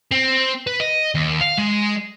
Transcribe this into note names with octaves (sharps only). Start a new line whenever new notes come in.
C4
B4
D#5
D#2
F5
G#3